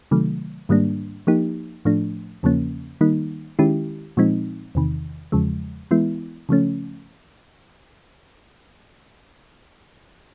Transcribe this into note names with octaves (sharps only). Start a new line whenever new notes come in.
C3 D#3 F#3 A3
G#2 D#3 G3 A#3 D4
F3 A#3 D#4 G4
A2 F3 A3 D4
E2 C#3 F3 A#3 C#4
D#3 G3 A#3 D#4
D#3 G#3 C#4 E4 G4
A#2 F3 G#3 C4 D#4
E2 C3 D#3
E2 C#3 F3 G#3
E3 G#3 B3 E4
C#3 F3 A3 C#4